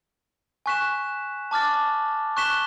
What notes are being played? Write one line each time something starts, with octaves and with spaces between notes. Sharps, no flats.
G#5 C#6 F#6 B6 E7
A5 D6 F6 A6
C#6 F#6 B6 E7 G7